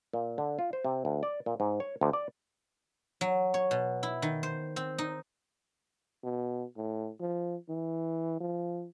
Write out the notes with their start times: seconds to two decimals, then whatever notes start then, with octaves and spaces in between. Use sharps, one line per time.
0.13 A#2
0.38 D3
0.59 F4
0.73 C5
0.85 C3
1.05 D2
1.23 D5
1.46 A#2
1.60 G#2
1.80 C#5
2.01 D2
2.13 D5
3.21 F#3
3.54 C#5
3.71 B2
4.03 E4
4.22 D#3
4.43 C5
4.76 C4
4.98 D#4
6.24 B2
6.77 A2
7.21 F3
7.69 E3
8.41 F3